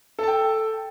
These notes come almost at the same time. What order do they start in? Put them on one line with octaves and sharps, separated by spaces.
A4 A5 G5